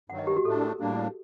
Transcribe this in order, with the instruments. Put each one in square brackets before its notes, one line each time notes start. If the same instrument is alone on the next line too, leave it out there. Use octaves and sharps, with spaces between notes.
[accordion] G2 D#3 F#3 [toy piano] F#5
[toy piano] D#5
G4
F#4
[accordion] A2 A3 D4 [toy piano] A4
[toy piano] A#4
[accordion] A2 G3 A#3 D4